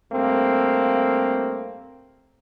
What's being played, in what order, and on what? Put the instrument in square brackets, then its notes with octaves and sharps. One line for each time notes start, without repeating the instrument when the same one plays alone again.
[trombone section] G2 A3 A#3 C4